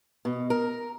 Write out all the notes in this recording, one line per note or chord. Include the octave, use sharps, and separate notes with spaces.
B2
A#4